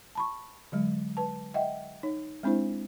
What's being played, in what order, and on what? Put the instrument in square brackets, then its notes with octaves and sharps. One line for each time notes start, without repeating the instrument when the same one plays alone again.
[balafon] A5 B5 C#6
D3 F#3 G#3
B4 A5
D#5 E5 F#5 G5
D#4 C#5
G#3 C4 D4 E4 C5